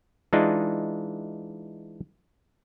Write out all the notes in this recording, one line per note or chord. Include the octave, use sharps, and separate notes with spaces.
E3 G#3 D4 D#4 F4